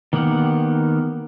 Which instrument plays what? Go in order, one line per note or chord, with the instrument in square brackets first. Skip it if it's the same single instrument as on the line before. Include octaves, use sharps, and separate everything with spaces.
[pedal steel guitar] D#3 A#3 B3 G4 F#5